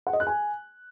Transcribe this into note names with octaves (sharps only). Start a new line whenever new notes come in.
F#5
D#5
F#6
G#5